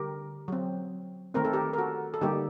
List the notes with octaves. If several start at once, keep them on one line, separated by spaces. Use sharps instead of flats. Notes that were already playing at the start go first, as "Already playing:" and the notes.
Already playing: D3 G3 G4 A#4
F#3 C4
D#3 A3 C4 A#4
A4
G4 A#4
A#4
F#4 A4
A4
D3 G3 A#3 D#4 G4